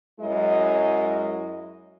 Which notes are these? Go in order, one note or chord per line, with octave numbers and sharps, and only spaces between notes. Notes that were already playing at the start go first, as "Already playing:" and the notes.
F#2 F#3 G#3 E4 D#5